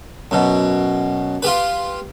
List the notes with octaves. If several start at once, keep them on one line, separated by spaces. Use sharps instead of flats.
F#2 B2
F4 G4 B4